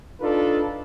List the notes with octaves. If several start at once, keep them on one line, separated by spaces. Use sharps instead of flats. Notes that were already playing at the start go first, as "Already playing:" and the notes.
D4 D#4 F4 A4 B4